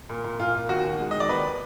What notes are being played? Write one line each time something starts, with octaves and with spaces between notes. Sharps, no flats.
A#2
A#2
A#2 F4
A#2
D#2 F#4
D#3
G#3
D#3 D#5
D5
D#2 B4